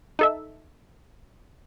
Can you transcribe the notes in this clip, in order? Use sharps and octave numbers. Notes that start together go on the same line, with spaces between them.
D#4 A4 E5